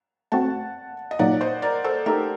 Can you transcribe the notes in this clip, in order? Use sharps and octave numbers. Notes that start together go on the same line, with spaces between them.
A3 C4 F#4 F#5 A5
D#5
A#2 F#3 A#3 D#4 D5 F#5
C5 D#5
A#4 D5
A4 C5
A3 D#4 G4 A4 A#4